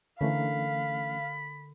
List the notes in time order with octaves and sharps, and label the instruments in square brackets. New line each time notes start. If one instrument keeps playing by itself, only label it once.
[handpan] D3 A#4 [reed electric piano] E3 A3 C#4 [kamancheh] F5 [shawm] B5